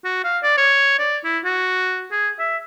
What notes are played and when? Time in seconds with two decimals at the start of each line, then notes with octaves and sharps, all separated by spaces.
0.04 F#4
0.24 F5
0.43 D5
0.57 C#5
0.99 D5
1.24 E4
1.44 F#4
2.12 G#4
2.39 E5